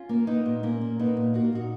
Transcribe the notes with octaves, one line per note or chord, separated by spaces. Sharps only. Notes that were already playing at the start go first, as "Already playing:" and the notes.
Already playing: C#4 F4
A#3
A#3 B3 D#4
A#2
A#2 A#3 C#4
A#2
A#3 B3 D#4
A#2
A#3 F#4
F4
A#2 D#4 F#4